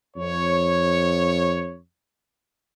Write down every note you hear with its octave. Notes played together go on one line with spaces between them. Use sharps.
F2 C#5